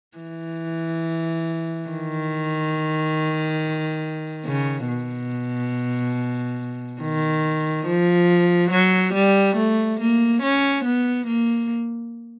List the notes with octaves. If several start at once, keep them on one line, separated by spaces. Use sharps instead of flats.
E3
D#3
C#3
B2
D#3
F3
F#3
G3
A3
A#3
C#4
B3
A#3